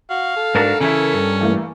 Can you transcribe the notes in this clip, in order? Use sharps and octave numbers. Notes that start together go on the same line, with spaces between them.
F#4 F5
A4
G#2 D4 F#4 A#4
C#3 E3 C#4 E4
G2
E3 A3 A#3